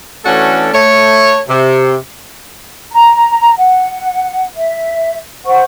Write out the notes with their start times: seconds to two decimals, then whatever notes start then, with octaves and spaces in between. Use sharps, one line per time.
0.25 E3 A3 C#4 D4 F#4 A4
0.73 A3 C#5
1.49 C3
2.92 A#5
3.58 F#5
4.57 E5
5.46 C5 F#5 C#6